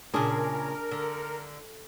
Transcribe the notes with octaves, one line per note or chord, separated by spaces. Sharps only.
A#2 C#3 D4 G#4 A#4
D3